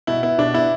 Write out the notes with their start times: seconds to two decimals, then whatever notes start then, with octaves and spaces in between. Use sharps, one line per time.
0.07 B2 E4
0.23 B3 E4
0.38 B2 D4
0.54 B3 E4